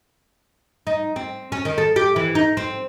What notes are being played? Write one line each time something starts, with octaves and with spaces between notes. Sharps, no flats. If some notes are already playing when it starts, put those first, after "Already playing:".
D#4
C4
C#4
D#3
A4
G4
E3
D#4
C4